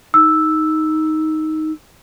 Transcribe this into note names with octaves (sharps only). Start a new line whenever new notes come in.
D#4 E6